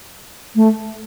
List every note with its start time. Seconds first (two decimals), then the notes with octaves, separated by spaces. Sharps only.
0.56 A3